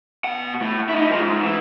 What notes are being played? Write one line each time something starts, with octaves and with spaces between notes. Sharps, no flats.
B2 F#5
A2
D#4 E4
F3 G#3
G#2
E3